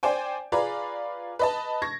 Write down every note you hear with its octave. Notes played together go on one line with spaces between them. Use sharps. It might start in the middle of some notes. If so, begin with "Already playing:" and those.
C5 D5 G5 G#5
F4 G#4 B4 D5 A#5
B4 D#5 A5
C#6 G#6 A#6